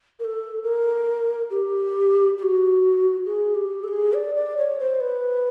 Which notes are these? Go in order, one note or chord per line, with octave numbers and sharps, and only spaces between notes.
A#4
A4
A#4
G4
G4
F#4
G#4
G4
A4
G#4
D5
D5
C#5
C5
B4